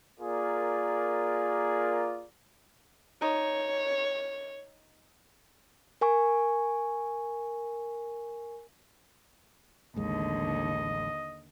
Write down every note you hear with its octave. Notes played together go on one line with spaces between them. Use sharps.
A#3 F4 G#4 A#4 D5
D#4 C#5
A#4 G#5 C#6
A1 D#2 D3 G#3 D#5